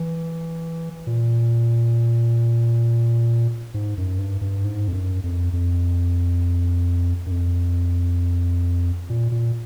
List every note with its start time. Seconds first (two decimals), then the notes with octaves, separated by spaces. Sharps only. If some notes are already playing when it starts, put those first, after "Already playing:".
Already playing: E3
1.07 A#2
3.74 G#2
3.98 F#2
4.19 G2
4.41 G2
4.64 G#2
4.88 F2
4.93 F#2
5.24 F2
5.53 F2
7.26 F#2
7.31 F2
9.10 A#2
9.32 A#2